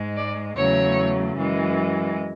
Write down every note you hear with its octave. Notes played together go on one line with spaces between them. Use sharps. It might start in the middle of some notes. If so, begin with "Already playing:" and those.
Already playing: G#2 G#3
D5
E2 C#3 F#3 A3 C#5
F#2 E3 G#3